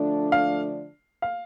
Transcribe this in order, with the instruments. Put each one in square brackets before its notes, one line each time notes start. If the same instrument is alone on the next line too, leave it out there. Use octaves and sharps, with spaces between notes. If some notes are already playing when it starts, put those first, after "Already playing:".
Already playing: [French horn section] D3 F3 A3 D4
[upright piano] F5
F5